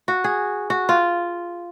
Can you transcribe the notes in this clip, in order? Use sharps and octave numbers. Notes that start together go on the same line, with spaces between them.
F#4
G#4
F#4
F4